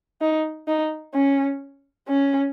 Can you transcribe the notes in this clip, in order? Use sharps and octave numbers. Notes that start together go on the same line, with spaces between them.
D#4
D#4
C#4
C#4